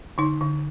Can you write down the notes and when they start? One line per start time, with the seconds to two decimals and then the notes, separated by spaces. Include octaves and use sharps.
0.18 D3 D#4
0.41 D3